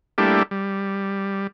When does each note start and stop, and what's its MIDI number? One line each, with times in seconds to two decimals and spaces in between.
0.18 0.43 55
0.18 0.43 57
0.18 0.43 58
0.18 0.43 62
0.18 0.43 64
0.18 0.43 67
0.51 1.47 55